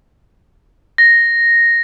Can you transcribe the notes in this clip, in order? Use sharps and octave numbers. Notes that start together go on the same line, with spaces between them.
A#6